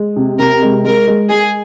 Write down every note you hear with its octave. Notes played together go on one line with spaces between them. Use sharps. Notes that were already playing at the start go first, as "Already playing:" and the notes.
Already playing: G#3
C3
C3 A#4
G#3
G#3 A#4
G#3
G#3 G#4